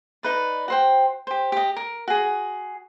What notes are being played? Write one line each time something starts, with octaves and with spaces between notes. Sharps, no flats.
D#4 B4 D5
F#4 C5 G5
G4 C5
G4 D#5
A#4
F#4 G#4